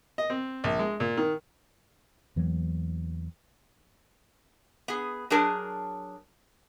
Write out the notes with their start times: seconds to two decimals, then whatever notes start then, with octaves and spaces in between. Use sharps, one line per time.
0.18 D#5
0.30 C4
0.64 A#1
0.79 G#3
1.00 A#2
1.17 D#3
2.36 E2 E3 F#3 A#3
4.88 B3 G#4
5.30 F#3 D4 G#4 A#4 A5